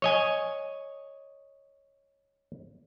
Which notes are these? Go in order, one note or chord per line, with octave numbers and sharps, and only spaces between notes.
C#5 D#5 G#5